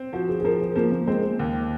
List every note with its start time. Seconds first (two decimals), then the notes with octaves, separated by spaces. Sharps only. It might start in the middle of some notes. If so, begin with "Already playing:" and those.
Already playing: C4
0.13 F3 F#4
0.29 G#4
0.40 G#4
0.44 F3 A#4
0.61 G#4
0.75 F3 A#3
0.92 A#3
1.07 G#3 C4
1.23 A#3
1.39 D#2